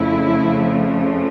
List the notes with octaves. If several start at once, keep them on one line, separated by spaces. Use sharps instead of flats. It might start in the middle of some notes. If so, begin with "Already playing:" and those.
Already playing: F2 C#3 F3 A3 E4